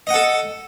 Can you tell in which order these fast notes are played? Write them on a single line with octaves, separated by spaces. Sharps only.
D#5 F#5 A4